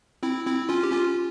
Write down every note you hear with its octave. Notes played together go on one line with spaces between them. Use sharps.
C4 E4
C4 E4
C#4 F4
G4
C#4 F4